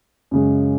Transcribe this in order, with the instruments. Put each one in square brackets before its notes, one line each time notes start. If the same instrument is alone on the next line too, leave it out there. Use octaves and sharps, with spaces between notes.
[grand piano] F#2 C#3 G#3